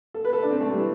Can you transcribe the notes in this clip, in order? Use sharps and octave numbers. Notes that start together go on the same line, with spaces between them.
A4
B4
A4
D4
C4
A3
G3
E3